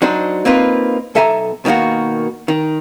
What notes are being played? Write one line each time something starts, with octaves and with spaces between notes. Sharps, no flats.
F#3 D4 D#4 C5
A#3 C4 D#4 F4 B4
B1 A4 E5 G#5 A#5
B2 D#3 G3 A#3 F#4
D#3